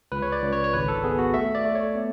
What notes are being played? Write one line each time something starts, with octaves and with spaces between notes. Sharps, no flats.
C#2 B4
C#5
D5
C#2
C#5
C#5
G#1 B4
A4
B3 G#4
F#4
A3 E5
D5
A3
C#5
B3